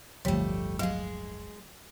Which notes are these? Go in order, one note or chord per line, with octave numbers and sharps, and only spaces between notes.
D1 G1 D3 F3 G3 A3 C#5
F#3 G#3 G#4 F5